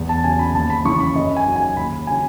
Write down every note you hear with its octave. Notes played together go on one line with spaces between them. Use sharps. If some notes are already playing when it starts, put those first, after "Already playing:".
Already playing: E2
A5
C#3 F#3 G#5
B5
D#2 A5
B5
C#3 E3 C#6
B5
F#2 D#5
G#5
D#3 F#3
G#5
D#2 B5
C#3 F#3 G#5